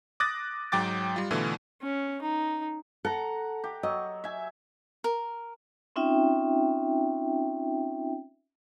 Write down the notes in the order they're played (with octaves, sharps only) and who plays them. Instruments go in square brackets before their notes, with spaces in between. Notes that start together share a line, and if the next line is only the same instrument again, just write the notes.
[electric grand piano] D6 D#6 F#6 A6 A#6
G#2 F#3 G5 D6 A6
G3 F4
B2 D3 E3 A3 F4
[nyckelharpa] C#4
D#4
[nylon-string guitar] A4 [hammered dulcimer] F#5 A#5
[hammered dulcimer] G4
[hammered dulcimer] F#3 [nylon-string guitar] D#5
[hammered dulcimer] E5 G#5
[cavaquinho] A#4
[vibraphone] C4 C#4 D#4 F4 E5 G5